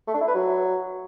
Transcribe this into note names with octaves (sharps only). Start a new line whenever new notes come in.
A3
D4
E4
B4
F#3